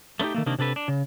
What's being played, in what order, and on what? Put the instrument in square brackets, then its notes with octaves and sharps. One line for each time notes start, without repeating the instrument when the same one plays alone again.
[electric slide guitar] A3 B3 C#4 D#4 G4
D#3 A3 A#3
C3 D#3 A#3 D4
C3 D4 A4 B4
D4
C#3